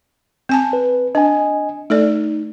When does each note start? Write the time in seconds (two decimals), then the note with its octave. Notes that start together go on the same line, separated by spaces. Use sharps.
0.49 C4 G#5 A5
0.73 B4
1.15 D4 D#5 G#5
1.90 A3 D#4 A4 D5